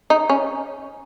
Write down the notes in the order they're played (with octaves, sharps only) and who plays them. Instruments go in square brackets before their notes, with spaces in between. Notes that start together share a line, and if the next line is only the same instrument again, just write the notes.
[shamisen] D#4
C#4